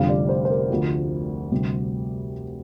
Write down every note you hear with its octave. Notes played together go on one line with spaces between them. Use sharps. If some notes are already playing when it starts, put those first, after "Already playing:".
Already playing: F1 F2 D3 G3 F5
D5
C5
C5
A#4
D2 D3 F3
D2 C3 G3